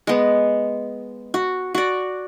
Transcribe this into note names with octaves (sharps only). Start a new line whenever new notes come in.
G#3 B3
F#4
F#4 D5